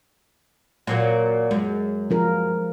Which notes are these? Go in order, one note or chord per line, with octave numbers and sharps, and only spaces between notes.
A#2 F#3 A#3
F#2 G#3
F3 F4 A#4